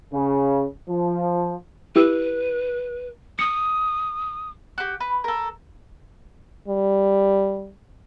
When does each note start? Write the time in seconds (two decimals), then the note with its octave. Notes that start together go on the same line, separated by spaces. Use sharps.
0.14 C#3
0.89 F3
1.96 E4 G4 B4 E6
3.39 D#6 C#7
4.78 F#4 G4
5.00 B4
5.24 A4 A#4
6.68 G3